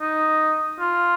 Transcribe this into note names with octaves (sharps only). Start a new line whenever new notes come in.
D#4
F4